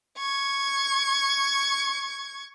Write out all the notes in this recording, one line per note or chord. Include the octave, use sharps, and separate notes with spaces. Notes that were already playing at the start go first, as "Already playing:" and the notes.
C#6 G#6